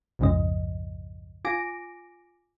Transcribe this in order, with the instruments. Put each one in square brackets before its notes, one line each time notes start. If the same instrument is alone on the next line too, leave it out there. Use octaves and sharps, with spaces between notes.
[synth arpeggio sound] B1 F2 G#2 C#3 F3 D#5
F4 G#5 D6 A#6 D7